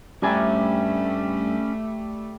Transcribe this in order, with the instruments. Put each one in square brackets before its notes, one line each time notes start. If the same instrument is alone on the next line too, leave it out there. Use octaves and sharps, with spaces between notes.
[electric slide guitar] G2 G#5 [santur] G3 D5 E5 [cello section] A3 [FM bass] C#4